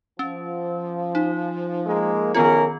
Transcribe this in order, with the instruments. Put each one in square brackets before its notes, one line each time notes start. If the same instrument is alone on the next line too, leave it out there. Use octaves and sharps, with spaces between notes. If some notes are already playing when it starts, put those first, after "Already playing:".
[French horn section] F3 [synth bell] C#4
[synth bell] D#4
[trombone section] G#3 A#3
[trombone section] B1 C#4 A#4 [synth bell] D#3 B3 F4